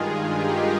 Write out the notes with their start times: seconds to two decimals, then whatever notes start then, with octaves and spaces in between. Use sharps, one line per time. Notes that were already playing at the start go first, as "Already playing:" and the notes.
Already playing: G2 D#3 G#3 F4 G#4
0.32 D#4 G4